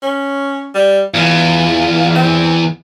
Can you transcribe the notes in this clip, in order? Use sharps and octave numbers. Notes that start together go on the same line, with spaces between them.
C#4
G3
E2 E3 F4
C4